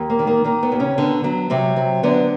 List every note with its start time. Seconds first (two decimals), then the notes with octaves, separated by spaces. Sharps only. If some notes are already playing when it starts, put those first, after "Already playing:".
Already playing: D#2
0.10 A#3
0.19 D#3
0.27 A#3
0.44 D#3 A#3
0.63 B3
0.72 D#2
0.79 C#3 C#4
0.98 D3 B3
1.24 F#3 B3
1.50 C3 F#3 C4
1.76 F#3
2.03 D3 B3